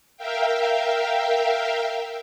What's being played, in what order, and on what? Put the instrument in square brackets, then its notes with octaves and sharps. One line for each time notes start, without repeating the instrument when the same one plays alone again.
[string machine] A#4 E5 F5 G5